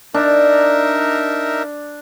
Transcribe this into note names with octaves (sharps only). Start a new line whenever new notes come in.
D4 D#4 A#4 E5